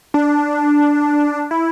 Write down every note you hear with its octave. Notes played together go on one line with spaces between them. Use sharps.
D4
E4